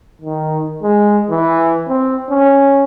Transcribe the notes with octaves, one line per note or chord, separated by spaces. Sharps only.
D#3
G#3
E3
C4
C#4